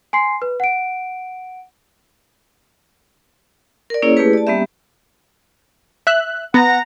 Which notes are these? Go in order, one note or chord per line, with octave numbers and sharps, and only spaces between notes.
G#5 C6 C7
B4
F#5 D7
A#4 D5
A#3 C#4 E4 G#4 C#5
A3 E4 G4 G#4 B4
D5 A5
G3 A#3 B3 C#4 G4 E5
E5 F#6
B3 F#5 A#5